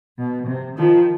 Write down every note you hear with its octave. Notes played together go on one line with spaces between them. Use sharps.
B2
C3
D#3 F3